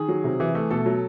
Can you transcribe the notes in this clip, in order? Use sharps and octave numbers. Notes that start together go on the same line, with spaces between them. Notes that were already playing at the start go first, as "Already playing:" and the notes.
Already playing: D#3 G#4
F#3
C3
E3
A3
B2 A4
F#3